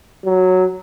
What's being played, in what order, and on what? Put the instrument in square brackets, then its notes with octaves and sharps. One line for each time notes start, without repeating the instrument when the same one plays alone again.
[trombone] F#3